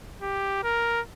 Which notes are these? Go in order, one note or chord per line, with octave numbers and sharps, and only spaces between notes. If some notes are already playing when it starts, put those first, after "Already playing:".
G4
A#4